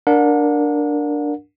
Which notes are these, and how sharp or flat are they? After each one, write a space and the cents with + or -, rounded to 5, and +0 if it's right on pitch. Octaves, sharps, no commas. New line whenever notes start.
D4 +0 A#4 +0 F#5 -35